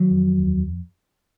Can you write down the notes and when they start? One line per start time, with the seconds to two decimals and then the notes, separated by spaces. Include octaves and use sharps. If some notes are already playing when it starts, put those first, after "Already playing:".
Already playing: D#3 F#3
0.10 F2
0.39 D#2